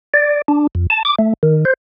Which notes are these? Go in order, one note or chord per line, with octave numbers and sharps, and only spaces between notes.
D5
D4
F2
A5
D6
A3
D#3
C5